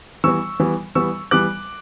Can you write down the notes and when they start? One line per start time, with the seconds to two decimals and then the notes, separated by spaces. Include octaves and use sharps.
0.24 E3 G3 B3 C#6 E6
0.60 E3 G3 B3
0.95 E3 G3 B3 C#6 E6
1.31 E3 G3 B3 D6 F#6